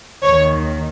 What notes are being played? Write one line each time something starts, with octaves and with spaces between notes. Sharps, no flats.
D#2 D#3 C#5